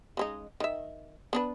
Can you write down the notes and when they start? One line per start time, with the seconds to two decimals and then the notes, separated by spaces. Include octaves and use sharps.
0.17 C#3 G#3 D#4
0.60 D#3 E5
1.33 B3 D4 B4